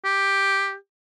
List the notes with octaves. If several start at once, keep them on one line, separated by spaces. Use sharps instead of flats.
G4